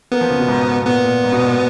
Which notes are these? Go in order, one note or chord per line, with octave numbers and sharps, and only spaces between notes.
A#3 B3
F3
C#3
B2
G#2
A#2 B3
A#2
G#2
B2
A#2